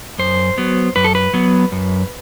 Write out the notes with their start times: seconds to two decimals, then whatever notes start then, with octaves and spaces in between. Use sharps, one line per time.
0.18 F#2 C5
0.58 F#3 B3
0.96 F#2 B4
1.04 A4
1.15 B4
1.34 F#3 B3
1.72 F#2